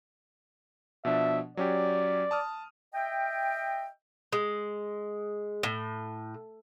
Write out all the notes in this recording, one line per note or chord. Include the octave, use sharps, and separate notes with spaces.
B2 F3 D4 E5
F#3 C#4 G4 D5
A5 D#6 F6
D#5 E5 G5
G#3
A2